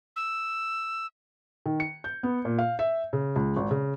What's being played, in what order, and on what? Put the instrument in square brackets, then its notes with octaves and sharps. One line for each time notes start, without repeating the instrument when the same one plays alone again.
[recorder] E6
[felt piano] D#3
C#7
G6
B3
A#2
F5
E5
C#3
C#2
G#1
C#3